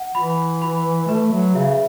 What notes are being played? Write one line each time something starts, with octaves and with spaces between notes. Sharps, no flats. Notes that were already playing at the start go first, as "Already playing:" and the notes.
Already playing: F#5
E3 B5
B5
A3 B4
F#3
C#3 E5